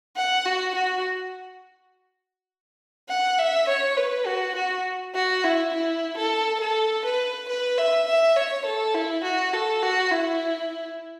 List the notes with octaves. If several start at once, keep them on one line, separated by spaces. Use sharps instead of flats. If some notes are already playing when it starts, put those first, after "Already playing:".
F#5
F#4
F#4
F#5
E5
C#5
B4
F#4
F#4
F#4
E4
E4
A4
A4
B4
B4
E5
E5
C#5
A4
E4
F#4
A4
F#4
E4